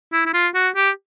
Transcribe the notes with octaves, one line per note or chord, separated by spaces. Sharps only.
E4
E4
F4
F#4
G4